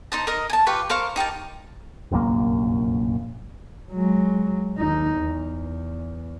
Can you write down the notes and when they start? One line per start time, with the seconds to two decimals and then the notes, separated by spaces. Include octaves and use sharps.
0.12 D#4 C5 A5
0.27 A#4 D#5
0.50 G#5 A5
0.66 F4 G4 B4 C#6
0.90 A#4 C5 F5 C#6
1.16 D#4 G4 A#4 A5
2.11 F1 A#1 F#2 A#3
3.92 F#3 G#3
4.77 D#2 D#4
5.17 E2